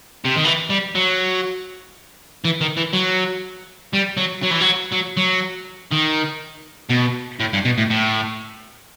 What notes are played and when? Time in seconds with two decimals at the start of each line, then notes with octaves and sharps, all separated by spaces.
0.25 C3
0.36 D#3
0.45 E3
0.70 G3
0.95 F#3
2.45 E3
2.61 D#3
2.77 E3
2.93 F#3
3.93 G3
4.17 F#3
4.43 F#3
4.51 E3
4.61 F#3
4.93 F#3
5.17 F#3
5.92 D#3
6.90 B2
7.40 A2
7.53 G2
7.65 B2
7.78 A2
7.90 A2